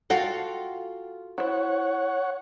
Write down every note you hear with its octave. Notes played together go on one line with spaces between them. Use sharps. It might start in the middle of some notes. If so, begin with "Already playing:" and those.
F4 F#4 A4 F#5 G5
E4 C5 C#5 F#5